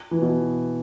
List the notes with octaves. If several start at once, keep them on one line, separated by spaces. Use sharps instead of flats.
E3
B2